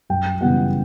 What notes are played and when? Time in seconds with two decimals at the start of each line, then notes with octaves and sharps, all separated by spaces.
0.10 F#2 G5
0.41 C#3 E3 G3 B3 F#5